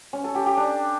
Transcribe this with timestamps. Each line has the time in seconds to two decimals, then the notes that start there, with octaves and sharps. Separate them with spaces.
0.13 C#4
0.24 A4
0.35 G4
0.46 G4
0.57 D4